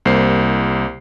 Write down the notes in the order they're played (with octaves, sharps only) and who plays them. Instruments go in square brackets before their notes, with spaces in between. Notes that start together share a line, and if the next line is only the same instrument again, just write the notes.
[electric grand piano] C2 A#3 C5 C7